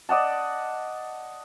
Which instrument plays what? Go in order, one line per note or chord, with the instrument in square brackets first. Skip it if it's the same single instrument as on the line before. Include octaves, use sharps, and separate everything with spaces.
[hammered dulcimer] D5 D#5 F#5 A5